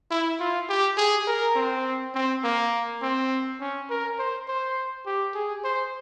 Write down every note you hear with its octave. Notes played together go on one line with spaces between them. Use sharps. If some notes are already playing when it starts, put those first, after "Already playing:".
E4
F4
G4
G#4
A#4
C4
C4
A#3
C4
C#4
A#4
C5
C5
G4
G#4
C5